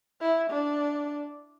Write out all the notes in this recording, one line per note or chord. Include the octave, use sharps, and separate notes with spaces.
E4
D4